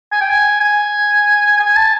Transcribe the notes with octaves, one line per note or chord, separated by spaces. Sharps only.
G#5
G5
G#5
G#5
G#5
A5